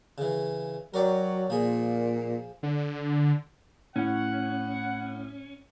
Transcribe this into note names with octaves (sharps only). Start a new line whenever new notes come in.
C#3 E3
F#3 A#4 D5 G5
A#2 F3 G#4
D3
A2 C#4 F#5